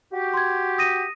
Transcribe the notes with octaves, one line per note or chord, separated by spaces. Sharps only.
F#4 G4
C6 G#6
D#6 A#6 D#7